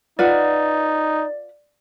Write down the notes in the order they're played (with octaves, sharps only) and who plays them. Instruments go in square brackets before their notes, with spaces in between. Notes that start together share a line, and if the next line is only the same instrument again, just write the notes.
[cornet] D#4 [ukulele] F4 B4 F#5 [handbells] D5